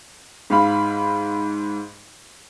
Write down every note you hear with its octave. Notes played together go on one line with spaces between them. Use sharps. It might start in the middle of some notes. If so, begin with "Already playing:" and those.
G#2 F5 B5